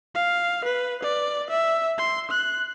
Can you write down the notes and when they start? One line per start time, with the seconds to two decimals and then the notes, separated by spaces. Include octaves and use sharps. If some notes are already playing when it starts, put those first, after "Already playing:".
0.15 F5
0.64 B4
1.03 D5
1.50 E5
1.98 C6
2.31 F#6